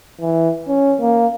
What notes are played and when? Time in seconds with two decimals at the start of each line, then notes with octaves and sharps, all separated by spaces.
0.21 E3
0.68 C#4
1.00 A#3